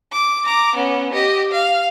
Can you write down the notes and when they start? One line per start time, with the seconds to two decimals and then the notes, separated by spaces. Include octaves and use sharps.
0.12 D6
0.45 A#5 D6
0.75 B3 C#4
1.13 G4 D#5
1.52 F5